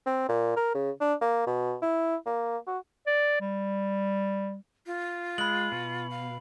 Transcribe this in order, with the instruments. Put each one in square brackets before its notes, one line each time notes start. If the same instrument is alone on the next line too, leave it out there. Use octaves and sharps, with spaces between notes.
[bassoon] C4
A#2
A#4
C#3
D4
A#3
B2
E4
A#3
F#4
[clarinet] D5
G3
[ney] F4
[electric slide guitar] G#3 [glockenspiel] B5 F#7
[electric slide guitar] B2
[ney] F5